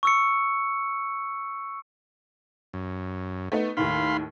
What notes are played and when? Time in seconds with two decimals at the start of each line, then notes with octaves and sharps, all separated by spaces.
0.03 C#6 E6 C#7
2.74 F#2
3.52 A3 B3 D#4
3.77 D#2 A2 D#3 F5 B5 C6